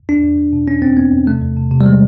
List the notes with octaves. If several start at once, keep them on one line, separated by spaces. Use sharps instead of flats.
E2 D4
E2
E2
B2
B2 C#4
E2 C4
E2 B3
E2
C3 A3
E2
C3
C3
G3
D#3 G#3